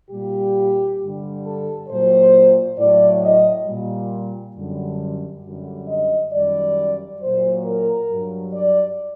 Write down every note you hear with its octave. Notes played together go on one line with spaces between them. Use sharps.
A#2 G3 G4
G2 D3 G3
A4
A#2 F#3 C5
A2 F#3 D5
D#5
A#2 G3
F#2 D3 G3
F#2 D3 G3
D#5
F#2 D#3 G3 D5
F#3 C5
A#2
A#4
G2 F#3
D5